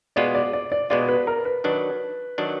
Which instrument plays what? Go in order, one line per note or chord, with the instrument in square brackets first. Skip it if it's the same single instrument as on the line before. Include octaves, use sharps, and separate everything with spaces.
[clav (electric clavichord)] B2 G#3 B3 F4 [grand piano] D5
[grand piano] D5
D5
D5
[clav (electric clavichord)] B2 G#3 B3 F4 [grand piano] D5
[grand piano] B4
A#4
B4
[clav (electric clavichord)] D#3 F#3 D4 [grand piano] B4
[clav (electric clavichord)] D#3 F#3 D4